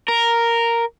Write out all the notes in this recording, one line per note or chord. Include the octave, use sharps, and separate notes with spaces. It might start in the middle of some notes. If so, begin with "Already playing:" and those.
A#4